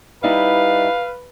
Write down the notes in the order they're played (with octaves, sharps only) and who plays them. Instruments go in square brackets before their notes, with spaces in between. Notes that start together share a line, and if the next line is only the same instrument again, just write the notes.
[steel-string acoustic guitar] G3 D#4 E4 [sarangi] B4 [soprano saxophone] F5